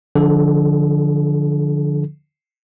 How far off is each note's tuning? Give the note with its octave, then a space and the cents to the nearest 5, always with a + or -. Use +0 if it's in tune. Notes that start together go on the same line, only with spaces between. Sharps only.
D3 +0 F3 +0 A4 -45